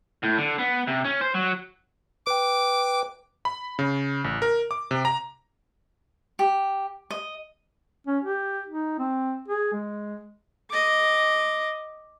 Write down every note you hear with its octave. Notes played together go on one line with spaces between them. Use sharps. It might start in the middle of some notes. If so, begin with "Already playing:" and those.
A2
D3
B3
C3
C#4
C5
F#3
B4 G5 D6
B5
C#3
A1
A#4
D6
C3
A#5
G4
D#5
C#4
G4
D#4
C4
G#4
G#3
D#5 D6